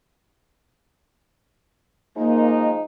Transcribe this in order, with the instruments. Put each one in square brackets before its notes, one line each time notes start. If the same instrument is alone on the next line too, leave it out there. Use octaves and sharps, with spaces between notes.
[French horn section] F3 G#3 D#4 [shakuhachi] A#3